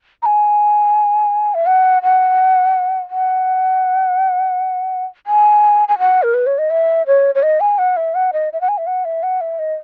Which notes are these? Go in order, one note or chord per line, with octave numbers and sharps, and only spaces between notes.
A#5
G#5
E5
F#5
F#5
F#5
G#5
G#5
F#5
A#4
B4
C#5
D#5
E5
C#5
C#5
D#5
G#5
F#5
E5
F#5
D#5
E5
F#5
G#5
E5
F#5
E5
F#5
E5
D#5